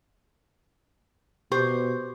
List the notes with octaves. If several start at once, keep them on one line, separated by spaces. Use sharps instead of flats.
B2 G4 C5 C#6